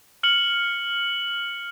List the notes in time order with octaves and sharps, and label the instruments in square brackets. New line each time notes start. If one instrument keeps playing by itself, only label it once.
[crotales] F6 C#7 F#7